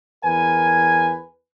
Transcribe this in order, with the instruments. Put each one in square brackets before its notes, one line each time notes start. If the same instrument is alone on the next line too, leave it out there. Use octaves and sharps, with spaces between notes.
[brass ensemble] E2 A#4 B4 G#5